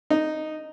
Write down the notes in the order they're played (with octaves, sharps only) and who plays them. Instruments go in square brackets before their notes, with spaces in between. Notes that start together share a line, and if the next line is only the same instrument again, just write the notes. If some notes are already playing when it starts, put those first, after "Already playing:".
[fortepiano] D#4